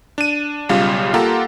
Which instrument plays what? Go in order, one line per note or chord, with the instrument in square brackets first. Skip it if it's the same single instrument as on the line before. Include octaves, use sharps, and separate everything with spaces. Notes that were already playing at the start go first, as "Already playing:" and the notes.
[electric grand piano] D4 D#7
B1 C#3 G3 F4 F5
A#3 F4 G4 A4 F#5 A#5